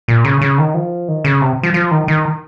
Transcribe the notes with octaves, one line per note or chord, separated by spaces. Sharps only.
A#2
C#3
C#3
D#3
F3
D#3
C#3
C3
F3
F3
D#3
D#3